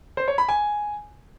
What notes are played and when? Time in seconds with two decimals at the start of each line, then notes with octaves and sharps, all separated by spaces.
0.17 C5
0.28 C#5
0.38 B5
0.49 G#5